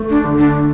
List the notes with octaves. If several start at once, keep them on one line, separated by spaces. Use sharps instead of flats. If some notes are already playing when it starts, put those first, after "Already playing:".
Already playing: A3
D4
D3
D4